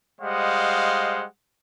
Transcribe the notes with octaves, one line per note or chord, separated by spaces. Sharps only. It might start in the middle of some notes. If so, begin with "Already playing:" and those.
G3 G#3 C5 D#5 F5 F#5